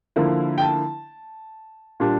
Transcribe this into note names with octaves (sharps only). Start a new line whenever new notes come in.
D3 F3 A#3 E4
G5
A5
A#2 G3 D4